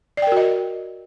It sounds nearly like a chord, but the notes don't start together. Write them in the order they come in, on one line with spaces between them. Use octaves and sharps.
D5 G5 A#4 F#4 D#5